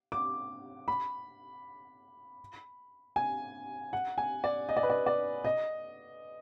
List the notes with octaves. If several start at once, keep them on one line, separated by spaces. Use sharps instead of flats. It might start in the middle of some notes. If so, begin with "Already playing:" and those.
D6
B5
G#5
F#5
G#5
D5
D#5
D5
B4
D5
D5
D#5